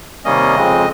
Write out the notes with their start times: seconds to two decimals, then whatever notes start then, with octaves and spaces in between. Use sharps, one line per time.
0.25 C3 D#3 G3 A#3 C#4 D#5
0.55 F2 C#3 G#3 C4